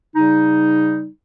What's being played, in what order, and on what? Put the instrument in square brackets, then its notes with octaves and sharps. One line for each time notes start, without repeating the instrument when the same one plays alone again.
[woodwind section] C#3 G3 D#4